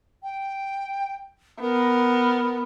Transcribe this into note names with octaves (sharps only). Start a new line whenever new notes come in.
G5
B3 A#4